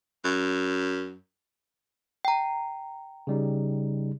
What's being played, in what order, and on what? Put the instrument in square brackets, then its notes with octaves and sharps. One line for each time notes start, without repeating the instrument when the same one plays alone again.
[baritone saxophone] F#2
[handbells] G5 A#5
[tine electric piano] C#3 G3 D#4